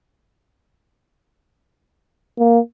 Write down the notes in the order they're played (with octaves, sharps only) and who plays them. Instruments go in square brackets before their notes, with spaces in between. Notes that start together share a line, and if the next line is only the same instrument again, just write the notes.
[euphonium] A#3